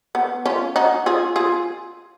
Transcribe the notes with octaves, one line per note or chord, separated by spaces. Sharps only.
B3
C#4 F4
D#4 F#4
F4 G#4
F4 G#4